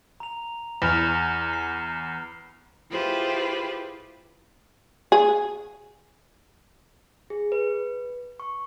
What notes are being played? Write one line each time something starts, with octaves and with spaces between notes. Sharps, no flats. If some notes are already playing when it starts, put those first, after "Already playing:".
A#5 F7
E2 B5 F6 F7
C7
E4 F4 G4 G#4 B4 C5
G#4
G#4
B4
C#6